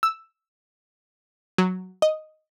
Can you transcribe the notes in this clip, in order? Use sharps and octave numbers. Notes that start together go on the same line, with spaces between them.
E6
F#3
D#5